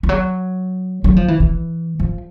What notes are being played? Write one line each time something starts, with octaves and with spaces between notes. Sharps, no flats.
F3
F#3
F#3
F3
E3
E3
F3